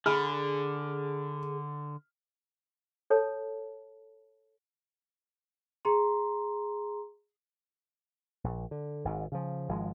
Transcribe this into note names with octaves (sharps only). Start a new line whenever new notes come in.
D3 G#4 B5 F6
A4 C#5 A5
G#4 A#5 C6
A#1
D3
G#1 G#2
C#3 F3
G#1 F3 G#3